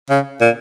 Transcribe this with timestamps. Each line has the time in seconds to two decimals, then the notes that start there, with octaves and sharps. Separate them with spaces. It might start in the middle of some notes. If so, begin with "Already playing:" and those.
0.10 C#3
0.41 A#2